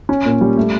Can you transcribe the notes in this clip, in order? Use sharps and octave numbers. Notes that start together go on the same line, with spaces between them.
C#4
A#2
G3
A3